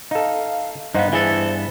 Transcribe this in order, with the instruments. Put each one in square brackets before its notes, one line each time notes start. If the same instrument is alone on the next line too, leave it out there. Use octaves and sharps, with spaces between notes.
[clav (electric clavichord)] D#4 A4 [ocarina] F5
[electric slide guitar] G2 B3 [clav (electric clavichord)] D#4 C5 F#5 [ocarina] F5
[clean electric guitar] E3 A4 [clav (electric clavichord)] E4 G#4 [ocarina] C5